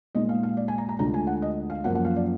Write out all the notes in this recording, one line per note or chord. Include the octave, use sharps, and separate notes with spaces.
A#2 G#3 D#4 D#5
F5
F5
D5
G#5
A#5
A#5
D2 D3 G#3 D4 F4 A#5
G#5
F#5
D#5
F5
F#2 F3 A#3 F4 F#5
F#5
F5
D5